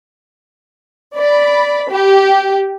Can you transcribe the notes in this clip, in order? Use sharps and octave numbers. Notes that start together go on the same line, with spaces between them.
D5 B5
G4